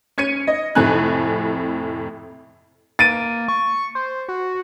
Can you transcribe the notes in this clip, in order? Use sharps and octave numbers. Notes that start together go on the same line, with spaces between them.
C#4 G#6 C#7 D#7
D#5
F2 A2 C3 G#5 F#6
A#3 A6 D7 D#7
C#6
C5
F#4